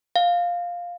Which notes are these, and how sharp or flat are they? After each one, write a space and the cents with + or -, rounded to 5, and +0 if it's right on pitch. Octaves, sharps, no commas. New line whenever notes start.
F5 +5